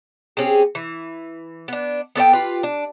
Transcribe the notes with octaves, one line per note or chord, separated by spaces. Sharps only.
C4 C#4 G4 G#4
E3
B3 D4
B3 A4 C#5 G5
F4 G4 B4
D4